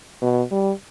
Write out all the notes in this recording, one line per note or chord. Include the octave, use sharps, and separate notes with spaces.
B2
G3